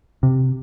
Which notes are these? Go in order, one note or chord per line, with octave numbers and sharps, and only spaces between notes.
C3